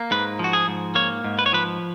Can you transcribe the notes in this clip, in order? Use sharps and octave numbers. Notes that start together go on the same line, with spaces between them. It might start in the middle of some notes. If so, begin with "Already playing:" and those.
Already playing: A#3
G#2 B4
F3 F#4
G#4
G#2
A#3 C#5
G#2
B4
C#5
F3 B4